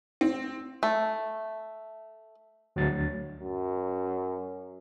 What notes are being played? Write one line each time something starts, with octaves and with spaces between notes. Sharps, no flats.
C4
A3
D2 F#3 A6
F#2